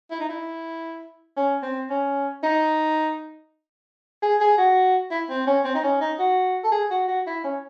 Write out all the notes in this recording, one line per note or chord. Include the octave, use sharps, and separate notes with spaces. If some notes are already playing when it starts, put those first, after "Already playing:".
E4
D#4
E4
C#4
C4
C#4
D#4
G#4
G#4
F#4
E4
C4
C#4
C4
D#4
C#4
D#4
F#4
A4
G#4
F#4
F#4
E4
C#4